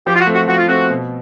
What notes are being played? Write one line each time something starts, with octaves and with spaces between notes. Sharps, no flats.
F3 G4
F4
F#4
A3 C4
F#4
F3 F#4
F4
A3 C4 F#4
B2